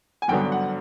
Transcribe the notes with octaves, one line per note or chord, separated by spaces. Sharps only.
G#5
G#1 G2 D3 F#3 B3 G5
F#5